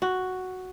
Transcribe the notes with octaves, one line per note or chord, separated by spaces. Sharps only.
F#4